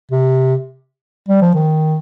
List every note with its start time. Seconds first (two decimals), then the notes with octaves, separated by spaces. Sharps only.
0.11 C3
1.28 G3
1.42 F3
1.55 D#3